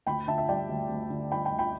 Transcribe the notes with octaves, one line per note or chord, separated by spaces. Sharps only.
D2 G5 B5
D3 E5 A5
E5
G3 D5 G5
D2
D2
D3
G3 G5 B5
G5 B5
D2
G5 B5